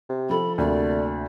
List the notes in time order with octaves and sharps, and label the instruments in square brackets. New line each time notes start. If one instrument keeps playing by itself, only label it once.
[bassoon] C3
[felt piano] F3 A4 [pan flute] B5
[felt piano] D2 C3 A#3 [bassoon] A3 [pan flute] D5